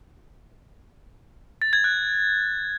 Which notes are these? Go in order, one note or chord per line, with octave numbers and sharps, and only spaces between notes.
A6
G#6
F#6